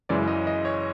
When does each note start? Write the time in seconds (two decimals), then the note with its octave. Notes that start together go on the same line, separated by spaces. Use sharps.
0.09 F#2 C#3 E3 G#3 D5
0.28 D#5
0.47 D#5
0.65 C#5